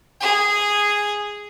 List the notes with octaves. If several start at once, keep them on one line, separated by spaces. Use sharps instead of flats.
G#4